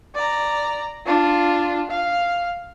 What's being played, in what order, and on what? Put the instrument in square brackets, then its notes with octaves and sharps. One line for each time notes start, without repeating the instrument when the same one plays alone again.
[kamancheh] D5 A#5
D4 F4
F5